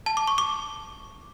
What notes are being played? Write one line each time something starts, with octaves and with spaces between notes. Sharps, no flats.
A5
D6
C#6
D6